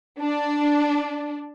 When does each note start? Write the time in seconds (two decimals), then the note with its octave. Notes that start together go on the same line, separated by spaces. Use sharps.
0.20 D4